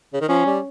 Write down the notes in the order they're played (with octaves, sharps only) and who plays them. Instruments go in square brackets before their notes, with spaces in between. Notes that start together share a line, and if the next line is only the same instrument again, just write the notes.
[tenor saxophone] C#3
D#3
[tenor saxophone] F3 [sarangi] C#4
[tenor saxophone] G3